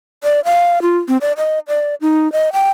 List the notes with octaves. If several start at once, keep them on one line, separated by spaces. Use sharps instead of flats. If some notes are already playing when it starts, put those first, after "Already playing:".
D5
F5
F4
C4
D5
D#5
D5
D#4
D#5
G5